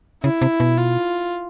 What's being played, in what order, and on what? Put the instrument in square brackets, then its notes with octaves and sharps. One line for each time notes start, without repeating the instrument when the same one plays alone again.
[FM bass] C#3 [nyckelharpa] E4
[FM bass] C3
B2
[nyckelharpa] F4